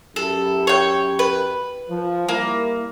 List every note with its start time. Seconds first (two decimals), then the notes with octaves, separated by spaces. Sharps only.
0.16 F#2 E4 G4 A4
0.67 C#5 G5
1.19 B4
1.90 F3
2.29 G3 A#3 E4